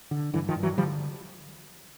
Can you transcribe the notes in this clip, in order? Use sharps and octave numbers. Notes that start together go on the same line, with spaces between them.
D3
G2 D3 E3
D#3 F3
G2
E3 F#3
D3 F3 G3